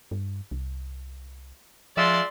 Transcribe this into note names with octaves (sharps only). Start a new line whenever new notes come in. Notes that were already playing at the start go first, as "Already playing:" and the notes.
G2
C2
F3 G#3 F4 D5 E5 C6